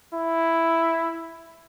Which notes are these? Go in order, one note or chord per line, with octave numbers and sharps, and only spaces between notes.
E4